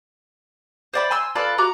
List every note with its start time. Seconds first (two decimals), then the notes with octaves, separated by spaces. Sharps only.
0.94 C5 D5 B5
1.11 G#5 C6 E6
1.35 F4 A4 B4 D5
1.58 F#4 A#5 D6